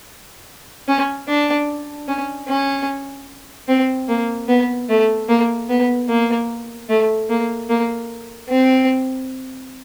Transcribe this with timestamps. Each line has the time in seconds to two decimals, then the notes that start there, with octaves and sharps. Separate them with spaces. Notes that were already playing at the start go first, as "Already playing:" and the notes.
0.88 C#4
1.28 D4
2.08 C#4
2.48 C#4
3.68 C4
4.08 A#3
4.48 B3
4.89 A3
5.29 A#3
5.69 B3
6.09 A#3
6.89 A3
7.29 A#3
7.69 A#3
8.50 C4